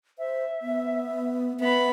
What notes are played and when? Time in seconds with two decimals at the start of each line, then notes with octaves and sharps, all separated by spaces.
0.19 C5 E5
0.62 B3
1.60 B3 E5 B5